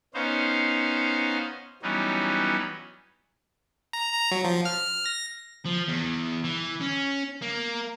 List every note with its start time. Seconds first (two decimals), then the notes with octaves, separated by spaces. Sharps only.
0.14 B3 C#4 D#4 C5 F5
1.82 E3 F#3 G3 B3 C#4 D#4
3.93 A#5
4.13 A#5
4.31 F#3
4.45 F3
4.65 F6
4.85 F6
5.06 A#6
5.65 F3
5.88 E2
6.44 E3
6.81 C#4
7.42 A#3